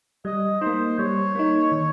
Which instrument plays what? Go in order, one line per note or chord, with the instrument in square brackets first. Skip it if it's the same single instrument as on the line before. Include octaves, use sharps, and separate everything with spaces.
[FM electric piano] G3 [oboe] D#5
[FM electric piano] A#3 D#4 [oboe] C5
[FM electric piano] G3 [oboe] C#5
[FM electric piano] A#3 D#4
D#3